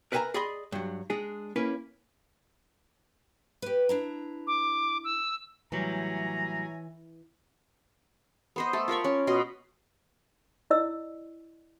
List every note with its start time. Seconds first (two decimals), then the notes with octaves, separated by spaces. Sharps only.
0.12 A#4 B4 E5 F5 G#5 A#5
0.34 G#4 D5 D#5 B5 C6
0.72 G2 F#3
1.10 G#3 D4 G#4
1.56 A#3 C#4 E4 B4
3.62 G4 B4
3.89 D4 E4 A#5
4.47 D6
5.04 E6
5.72 A2 E3 F#3 G3 C#5 E5 G#5 A#5
8.56 B3 C5 D#5
8.73 A3 A4
8.88 F4 A#4 B5 C#6
9.04 C#4
9.27 B2 D#5 C6
10.70 E4 D5 D#5 E6